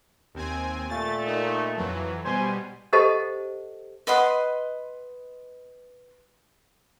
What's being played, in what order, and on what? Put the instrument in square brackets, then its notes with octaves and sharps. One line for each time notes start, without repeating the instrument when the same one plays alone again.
[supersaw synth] D#2 C4 G#5
[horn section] A#2 A3 [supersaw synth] A6
[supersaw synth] D#4
F2 E3 F#3
[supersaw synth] B2 G3 [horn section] C5 G#5
[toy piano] G4 A4 C5 D#5 F#5 A5
[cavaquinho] B4 D#5 F#5 C6